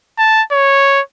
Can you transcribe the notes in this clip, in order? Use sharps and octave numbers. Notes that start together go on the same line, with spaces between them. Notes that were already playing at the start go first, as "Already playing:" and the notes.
A5
C#5